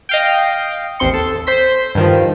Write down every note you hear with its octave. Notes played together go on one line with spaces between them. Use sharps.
D#5 F5 G5
A1 D#2 C4 C6 C#7
A4
C5 C6 B6
G2 D#3 F3